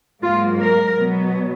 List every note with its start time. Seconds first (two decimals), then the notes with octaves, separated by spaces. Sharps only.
0.21 G#2 F#3 A#3 F4
0.59 A#4
0.97 B2 F#3 B3